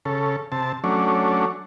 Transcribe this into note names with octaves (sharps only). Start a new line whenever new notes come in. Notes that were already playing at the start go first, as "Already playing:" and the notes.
C#3 A4
C3 A5
F#3 A3 C#4 D4